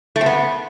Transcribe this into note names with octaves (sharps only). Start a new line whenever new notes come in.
A3
C4
B3